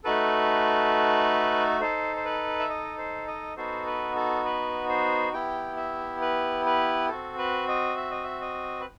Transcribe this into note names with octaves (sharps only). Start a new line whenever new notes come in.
A3 D#4 F#4 A4 B4
D#4 A4 C5
C5
B4
E5
D#5
C5
D#5
B3 D#4 F#4 A4 C5
B4
A4
B4
C5
B3 E4 G4 G5
E5
B4
B4
C4 F#4 A4
B4
D#5
E5
D#5
E5
D#5
B4